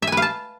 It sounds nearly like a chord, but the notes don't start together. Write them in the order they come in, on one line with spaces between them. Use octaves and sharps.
E5 G#5 B4 F5 A5